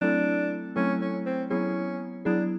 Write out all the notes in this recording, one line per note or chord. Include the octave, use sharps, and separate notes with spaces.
F#3 A3 C4 D4 E4 A4
F#3 A3 C4 C#4 E4 A4
C#4
C4
F#3 B3 C#4 E4 G#4
F#3 B3 D4 E4 G#4